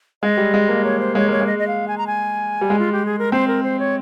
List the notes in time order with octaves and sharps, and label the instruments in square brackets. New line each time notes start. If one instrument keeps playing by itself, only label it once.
[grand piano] G#3 [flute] D#5
[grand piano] G3
G#3
A#3
[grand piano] A#3 [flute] C#5
[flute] C5
[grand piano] G#3 [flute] C#5
[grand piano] A#3 [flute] C#5
[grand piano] G#3
[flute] D#5
D#5
F5
G#5
A#5
G#5
[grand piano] G3
G#3
[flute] F4
G4
G#4
A#4
[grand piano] C4 [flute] C5
[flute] A#4
C5
C#5